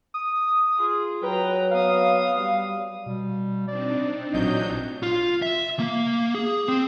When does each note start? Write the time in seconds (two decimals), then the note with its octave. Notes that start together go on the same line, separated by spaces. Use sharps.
0.14 D#6
0.77 F4 G#4
1.23 F#3 B4 G5 A#5
1.71 B3 F5 D#6
2.38 G3
3.06 B2 G3
3.68 C4 D4 D#4 D5
4.33 A1 A#2 F#3 D#5 G6
5.03 F4
5.42 E5
5.79 A#3
6.35 G#4
6.68 C4